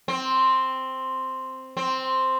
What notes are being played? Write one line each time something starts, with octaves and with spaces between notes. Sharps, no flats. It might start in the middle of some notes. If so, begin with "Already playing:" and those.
C4
C4